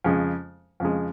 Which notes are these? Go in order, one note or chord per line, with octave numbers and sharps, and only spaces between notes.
F2 C#3 G#3
F2 C#3 G#3